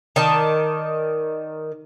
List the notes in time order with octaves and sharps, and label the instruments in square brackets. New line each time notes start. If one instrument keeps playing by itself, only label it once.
[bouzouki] D#3 D5 A5